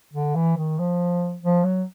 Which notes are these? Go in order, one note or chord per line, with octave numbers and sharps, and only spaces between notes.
D3
E3
D#3
F3
F3
F#3